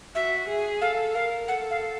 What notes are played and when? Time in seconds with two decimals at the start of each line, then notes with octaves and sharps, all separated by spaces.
0.15 F#4 E5
0.48 G#4
0.81 A4 F5
1.15 A#4 F5
1.48 A4 F#5
1.71 F5